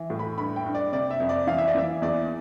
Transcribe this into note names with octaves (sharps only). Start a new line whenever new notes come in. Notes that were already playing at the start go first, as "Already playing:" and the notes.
Already playing: E3
A2
B5
G2 B5
G5
G2
D5
C3 D5
E5
F2
D5
E3 F5
E5
D5
E3 E5
E2 D5